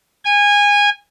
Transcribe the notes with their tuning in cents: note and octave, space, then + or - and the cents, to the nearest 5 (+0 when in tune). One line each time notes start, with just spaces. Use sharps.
G#5 -20